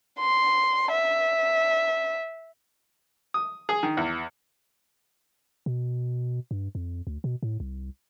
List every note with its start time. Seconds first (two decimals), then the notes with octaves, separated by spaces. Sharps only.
0.19 C6
0.91 E5
3.34 D#6
3.69 G#4
3.83 D#3
3.97 E2
5.66 B2
6.51 G2
6.75 F2
7.07 D2
7.24 B2
7.43 A2
7.60 C2